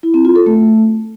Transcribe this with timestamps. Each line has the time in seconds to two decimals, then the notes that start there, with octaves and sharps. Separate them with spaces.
0.03 E4
0.14 C4
0.25 F4
0.36 A4
0.46 A3